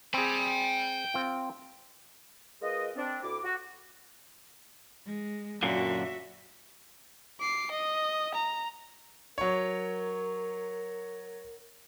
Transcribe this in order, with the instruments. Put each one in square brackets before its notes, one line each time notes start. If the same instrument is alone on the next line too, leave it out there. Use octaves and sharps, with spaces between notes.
[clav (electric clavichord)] C4 G#4 [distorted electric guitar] G5 B5
[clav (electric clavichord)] C4 F4
[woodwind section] G#3 F4 A#4 B4 D#5
C4 D4
D2 E4 D6
F#4
[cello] G#3
[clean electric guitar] F#2 A#2 D3 [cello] F#4 E5
[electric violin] D6 C7
D#5
A#5
[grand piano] F#3 C#5 [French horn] A#4